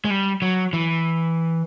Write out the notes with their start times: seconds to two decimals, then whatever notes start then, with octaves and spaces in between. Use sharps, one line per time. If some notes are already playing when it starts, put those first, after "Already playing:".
0.05 G#3
0.10 G3
0.42 F#3
0.73 E3